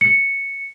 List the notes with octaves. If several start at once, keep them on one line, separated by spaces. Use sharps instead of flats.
C#7